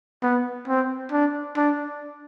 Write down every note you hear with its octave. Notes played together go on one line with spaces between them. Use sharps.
B3
C4
D4
D4